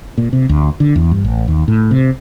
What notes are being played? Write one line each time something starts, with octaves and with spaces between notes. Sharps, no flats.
A#2
C3
D2
D3
E2
G2
A1
D#2
A2
C3